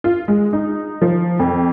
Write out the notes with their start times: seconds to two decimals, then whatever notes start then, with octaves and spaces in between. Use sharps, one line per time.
0.04 F4
0.28 G#3
0.53 D#4
1.02 F3
1.39 F2